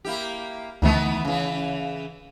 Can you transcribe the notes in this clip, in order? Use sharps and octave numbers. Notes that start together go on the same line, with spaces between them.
A#3 E4 G4
D2 D#3 E3 A3 B3
C#3 E3